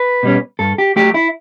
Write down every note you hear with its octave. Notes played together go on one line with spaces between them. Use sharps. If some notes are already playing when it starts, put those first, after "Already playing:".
Already playing: B4
B2 G3 C#4
G2 A4
G4
F#3 A3 G4
E4